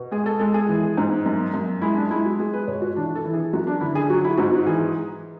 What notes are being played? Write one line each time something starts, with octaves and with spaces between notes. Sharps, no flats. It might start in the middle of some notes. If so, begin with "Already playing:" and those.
Already playing: B2
G#3 G#4
A4
G#3 A4
G#4
E3
G#2
F#2
F#2
G#3 E4
D4
G#3 E4
F#4
G#3 G#4
B4
B2 C#5
F#4
E3 D4
A4
E3
G#4
F#2 F#4
D4
D3 E4
G#4
F#3 F#4
E4
G#2 F#4
F#4
E3 G#4